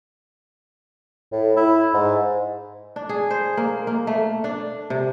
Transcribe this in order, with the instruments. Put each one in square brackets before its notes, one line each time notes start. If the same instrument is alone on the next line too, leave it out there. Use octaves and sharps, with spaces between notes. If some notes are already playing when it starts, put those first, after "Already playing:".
[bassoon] A2
E4
G#2
[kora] D4
G#4
C5
A#3
A#3
A3
D4
C3